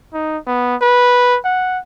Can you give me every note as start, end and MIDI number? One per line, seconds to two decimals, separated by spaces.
0.13 0.38 63
0.47 0.76 59
0.82 1.38 71
1.44 1.79 78